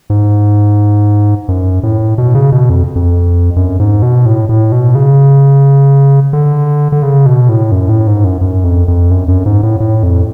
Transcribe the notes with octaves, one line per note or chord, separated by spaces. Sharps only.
G#2
F#2
A2
B2
C#3
B2
F2
F2
F#2
G#2
B2
A2
A2
B2
C#3
D3
D3
C#3
B2
A2
F#2
A2
G#2
F#2
F#2
F2
F2
F#2
F#2
G#2
A2
A2
F2